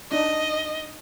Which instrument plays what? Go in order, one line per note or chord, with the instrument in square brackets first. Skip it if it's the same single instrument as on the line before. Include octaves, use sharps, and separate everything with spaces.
[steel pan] D4 D#4 [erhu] D#5